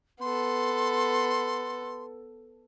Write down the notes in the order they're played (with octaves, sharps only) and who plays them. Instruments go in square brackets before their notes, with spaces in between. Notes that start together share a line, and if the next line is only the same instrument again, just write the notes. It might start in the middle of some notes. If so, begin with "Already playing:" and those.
[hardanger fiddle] B3 A4 [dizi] C6